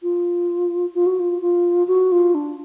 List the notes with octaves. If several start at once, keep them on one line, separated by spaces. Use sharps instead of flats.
F4
F4
F#4
F4
F4
F#4
F4
D4